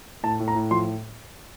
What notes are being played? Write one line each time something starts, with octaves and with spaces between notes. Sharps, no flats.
A2 A5
A2
A#5
A2
F3 C6